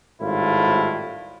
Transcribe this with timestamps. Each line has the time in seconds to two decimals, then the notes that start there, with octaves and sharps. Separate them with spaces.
0.21 G#1 A2 G3 E4 F4